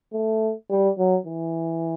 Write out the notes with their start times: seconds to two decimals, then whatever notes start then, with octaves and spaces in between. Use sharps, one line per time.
0.14 A3
0.70 G3
0.98 F#3
1.26 E3